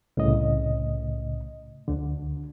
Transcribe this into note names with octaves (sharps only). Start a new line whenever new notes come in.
C2 A2 C#3 D#5
D2 D3